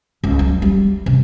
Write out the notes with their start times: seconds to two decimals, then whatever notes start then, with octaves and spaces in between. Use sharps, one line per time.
0.24 C#2
0.39 F#3
0.62 G3
1.06 C3